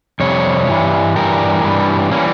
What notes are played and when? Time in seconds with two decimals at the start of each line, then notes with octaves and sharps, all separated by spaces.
0.20 F2 C3 G3 C#5
0.68 G2 E3 G3
1.16 G2 E3 G3 G4 A#4
1.64 G2 E3 G3
2.11 E3 G3 A#3 C#4